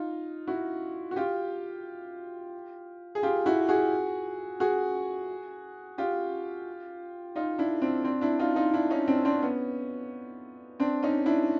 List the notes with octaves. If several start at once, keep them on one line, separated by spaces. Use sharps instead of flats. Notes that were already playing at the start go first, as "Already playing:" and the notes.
Already playing: D#4 F4
E4 F#4
F#4
F4 G4
G#4
F4 G4
E4 F#4
F#4 G#4
F#4 G#4
F4 G4
D#4 F4
D4 E4
C4 D4
C4 D4
D4 E4
D#4 F4
D#4 F4
D4 E4
C#4 D#4
C4 D4
C4 D4
B3 C#4
C4 D4
C#4 D#4
D4 E4